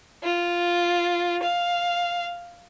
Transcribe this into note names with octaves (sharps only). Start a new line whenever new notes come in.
F4
F5